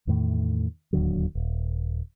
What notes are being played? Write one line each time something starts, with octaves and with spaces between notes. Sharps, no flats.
E2 A2 D#3 A3
D1 D#2 D3 F#3
D#1